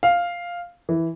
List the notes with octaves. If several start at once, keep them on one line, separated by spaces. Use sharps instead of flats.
F5
E3